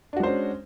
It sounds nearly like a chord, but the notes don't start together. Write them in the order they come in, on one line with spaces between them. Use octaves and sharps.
D4 F#4 G#3 C5 C#4